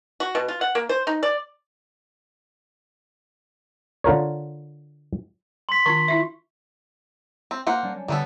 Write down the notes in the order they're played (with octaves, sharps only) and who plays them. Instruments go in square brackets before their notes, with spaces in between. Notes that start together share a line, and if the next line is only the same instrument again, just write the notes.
[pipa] F#4
B2
F4
F#5
A#3
C5
D#4
D5
[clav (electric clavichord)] D3 F4 A#4 C#5
[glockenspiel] C6 B6
[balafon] D#3 D4 F4 [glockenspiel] C#6
[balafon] E4 F4 E5
[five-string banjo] C4
A#3 C5 F#5
[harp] G3 C#4 D4
[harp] D3 [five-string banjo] G3 B3 A4